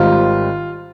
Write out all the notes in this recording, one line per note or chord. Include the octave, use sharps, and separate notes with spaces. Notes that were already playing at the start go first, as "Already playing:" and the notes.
Already playing: G#1 G#2 G3 C4 F4